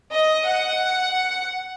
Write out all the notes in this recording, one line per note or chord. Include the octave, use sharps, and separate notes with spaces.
D#5
F#5